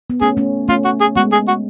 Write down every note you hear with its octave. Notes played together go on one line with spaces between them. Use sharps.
B3
A3 C#4 G#4
A3 C#4
A3 C#4 F4
F#4
G#4
G#3 B3 F#4
G#4
F#4